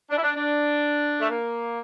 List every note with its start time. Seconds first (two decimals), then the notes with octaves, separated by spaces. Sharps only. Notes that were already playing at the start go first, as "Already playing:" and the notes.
0.11 D4
0.17 E4
0.23 D4
0.34 D4
1.21 A3
1.29 A#3